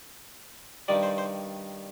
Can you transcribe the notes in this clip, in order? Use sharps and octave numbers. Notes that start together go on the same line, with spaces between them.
G2 D#3 G3 D5
C5
C5